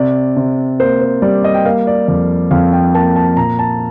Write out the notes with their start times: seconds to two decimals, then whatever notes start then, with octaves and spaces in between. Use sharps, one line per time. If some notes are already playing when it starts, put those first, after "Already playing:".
Already playing: C3 D5
0.36 C3
0.80 A#3 C5
1.01 C5
1.22 G3 D5
1.44 D#5
1.55 G5
1.65 A#3 F5
1.87 D5
2.08 F2 D5
2.51 F2 F5
2.73 G5
2.94 A#3 A5
3.16 A5
3.37 A#2 A#5
3.59 A5